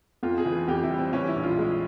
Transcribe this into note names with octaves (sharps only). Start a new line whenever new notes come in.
F2 F4
G#4
E3
F2 G4
E4
G3
C4
E3 C#4
E4
A#1
F4
G#3